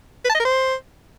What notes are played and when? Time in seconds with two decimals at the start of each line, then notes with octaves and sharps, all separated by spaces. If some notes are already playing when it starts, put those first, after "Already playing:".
0.25 B4
0.30 A5
0.35 D#5
0.40 A#4
0.45 C5